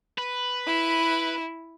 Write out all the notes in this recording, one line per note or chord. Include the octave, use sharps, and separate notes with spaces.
B4
E4